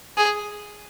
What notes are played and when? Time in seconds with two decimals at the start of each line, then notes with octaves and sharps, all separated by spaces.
0.17 G#4